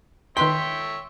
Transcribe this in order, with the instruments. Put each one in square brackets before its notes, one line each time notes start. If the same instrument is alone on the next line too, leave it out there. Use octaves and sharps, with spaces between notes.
[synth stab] D#3 B4 B6 [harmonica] C#5 E5 [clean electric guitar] G5 [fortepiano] C6